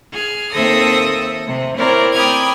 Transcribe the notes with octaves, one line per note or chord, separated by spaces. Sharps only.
G#4 F6
D#2 C4 A4 E5 D#6 A#6
C3
C4 E4 A#4 C#5 D5
G5 B5 D6 D#6 F6 G#6